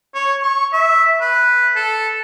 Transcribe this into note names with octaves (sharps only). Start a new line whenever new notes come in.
C#5
C#6
E5
B4
A4